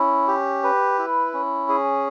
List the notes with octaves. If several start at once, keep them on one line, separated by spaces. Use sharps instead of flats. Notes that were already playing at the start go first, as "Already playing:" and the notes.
Already playing: C#4 E4
G4
B4
E4
C#4
G#4